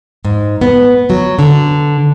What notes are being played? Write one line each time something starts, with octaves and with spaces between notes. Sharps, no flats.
G#2
B3
F#3
D3